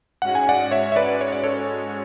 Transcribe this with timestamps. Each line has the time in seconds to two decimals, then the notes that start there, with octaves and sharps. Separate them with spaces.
0.22 G#2 G#3 C#4 F#4 F#5
0.35 G#5
0.49 D5 F#5
0.71 C#5 E5
0.92 E5
0.96 B4 D5
1.21 C#5
1.32 D5
1.43 A4 C#5